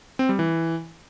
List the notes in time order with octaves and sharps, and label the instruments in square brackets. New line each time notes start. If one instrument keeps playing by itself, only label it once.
[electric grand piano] C4
G3
E3